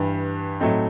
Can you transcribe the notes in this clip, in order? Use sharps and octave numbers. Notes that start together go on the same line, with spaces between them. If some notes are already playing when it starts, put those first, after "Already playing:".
Already playing: G2 E3 G3
A2 F#3 A3 C4 D#4